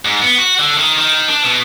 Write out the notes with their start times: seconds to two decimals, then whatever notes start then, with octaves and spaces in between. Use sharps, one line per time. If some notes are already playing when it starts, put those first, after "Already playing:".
0.05 G#2
0.22 B3
0.38 F#4
0.59 D3
0.77 D#3
0.98 D#3
1.28 D4
1.44 B2